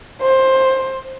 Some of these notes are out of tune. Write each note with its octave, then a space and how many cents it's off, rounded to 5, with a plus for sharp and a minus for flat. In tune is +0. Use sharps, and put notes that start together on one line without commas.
C5 +15